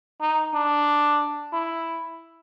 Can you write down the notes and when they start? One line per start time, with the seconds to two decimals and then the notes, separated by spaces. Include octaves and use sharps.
0.21 D#4
0.54 D4
1.53 E4